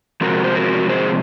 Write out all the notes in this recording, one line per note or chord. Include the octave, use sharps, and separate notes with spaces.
C3 F3 G#3 C4 F#4 A#4
C5
F#4 A#4
G#4 C5